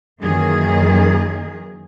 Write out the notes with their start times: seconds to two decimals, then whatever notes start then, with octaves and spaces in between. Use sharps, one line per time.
0.20 F#2 D#3 E3 A#3 G#4